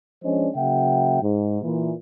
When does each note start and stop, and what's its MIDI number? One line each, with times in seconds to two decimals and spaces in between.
0.23 0.48 53
0.23 0.48 56
0.23 0.48 61
0.23 0.48 62
0.23 0.48 72
0.23 0.48 75
0.56 1.20 49
0.56 1.20 54
0.56 1.20 58
0.56 1.20 76
0.56 1.20 78
0.56 1.20 79
1.21 1.61 44
1.62 1.92 46
1.62 1.92 52